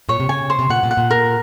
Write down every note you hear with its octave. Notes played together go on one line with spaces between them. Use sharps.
A#2 C#5
C3
C#3 G#5
C5
C3
A#2 F#5
A#2
F#5
A#2
A#4